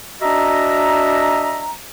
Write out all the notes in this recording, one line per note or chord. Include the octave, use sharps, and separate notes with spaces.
D4 F#4 D#5 E5 A#5